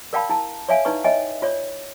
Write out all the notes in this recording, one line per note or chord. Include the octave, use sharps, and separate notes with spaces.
A#4 D5 F5 G5 A5 B5
E4 A5
C#5 D5 E5 F5 G#5
D#4 E4 B4 D5 C#6
C#5 D#5 E5 G5 G#5
F4 C#5 D5